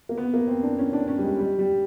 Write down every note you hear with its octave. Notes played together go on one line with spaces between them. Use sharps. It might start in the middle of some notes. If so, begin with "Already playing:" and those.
A#3
B3
A#3
C4
D4
C#4
D4
C#4
G3
G#3
G3
G3